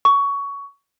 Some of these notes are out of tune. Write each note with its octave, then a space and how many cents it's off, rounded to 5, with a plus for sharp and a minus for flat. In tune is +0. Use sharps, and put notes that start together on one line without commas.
C#6 +20